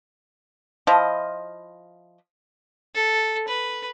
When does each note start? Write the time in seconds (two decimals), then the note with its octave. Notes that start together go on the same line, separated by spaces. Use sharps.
0.87 F3 E4 F4 D#5
2.95 A4
3.48 B4